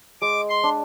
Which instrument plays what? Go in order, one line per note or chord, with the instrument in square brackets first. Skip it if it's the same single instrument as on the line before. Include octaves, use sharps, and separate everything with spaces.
[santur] G#3 [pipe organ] D6
[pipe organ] C6
[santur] D4